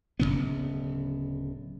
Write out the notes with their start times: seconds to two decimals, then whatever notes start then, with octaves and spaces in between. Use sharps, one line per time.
0.19 D1 F2 C#3 B3